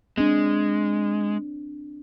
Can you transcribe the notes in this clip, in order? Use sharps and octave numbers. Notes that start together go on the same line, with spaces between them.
G#3 C4 D4